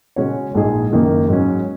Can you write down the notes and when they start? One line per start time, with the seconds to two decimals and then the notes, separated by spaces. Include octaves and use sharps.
0.16 C#3 G#3 C#4 F#4 C#5
0.54 A#1 G#2 G#3 D#4 G#4
0.92 F#1 F#2 D#3 A#3 D#4
1.28 G#2 F#3 C#4